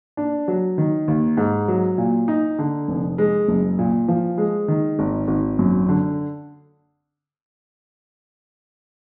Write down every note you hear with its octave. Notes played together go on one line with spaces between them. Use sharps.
D4
F#3
D#3
D#2
G#2
F#3
A#2
D#4
D3
F1
G#3
F#1
A#2
F3
G#3
D#3
G#1
G#1
F#2
D3